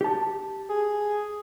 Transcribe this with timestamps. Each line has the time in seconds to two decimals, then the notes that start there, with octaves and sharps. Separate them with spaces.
0.01 G4 A5
0.69 G#4